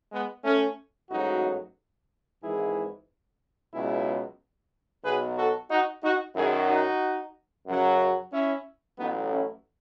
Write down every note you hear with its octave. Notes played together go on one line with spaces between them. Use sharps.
G#3 B3
A3 C#4
A1 G#2 F#3 D#4 F#4
G#1 G#2 E3 E4 G#4
C#2 B2 F#3 E4 G#4
B1 B2 F#3 G#4 B4
F#4 A4
D#4 F#4
D#4 F#4
F#2 D#3 F#3 E4 G#4
D#4 F#4
F#2 C#3 F#3
C#4 E4
A1 A2 F#3 B3 D#4
C#4 E4